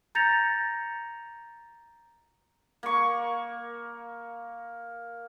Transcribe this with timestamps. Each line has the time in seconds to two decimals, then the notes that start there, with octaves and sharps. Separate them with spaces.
0.15 A#5 G6 A6 A#6 C#7 F7
2.83 A#3 C#6